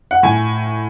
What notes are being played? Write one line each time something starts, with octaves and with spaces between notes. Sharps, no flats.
F#5
A2 G#5